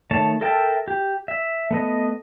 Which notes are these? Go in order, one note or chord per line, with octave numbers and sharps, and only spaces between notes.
D#3 A3 C#5 A5
A4 A#4 E5 G5 A5
G4
E5
A3 B3 D#5